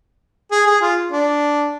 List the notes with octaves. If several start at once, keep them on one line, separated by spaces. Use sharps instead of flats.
G#4
G#4
F4
D4